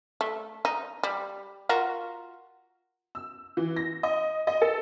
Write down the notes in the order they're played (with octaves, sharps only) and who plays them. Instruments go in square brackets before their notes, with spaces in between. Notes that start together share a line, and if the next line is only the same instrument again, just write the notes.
[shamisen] A3
D#4
G3
F4 F#4 A#4
[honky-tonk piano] E6
E3
A#6
D#5
D#5
A4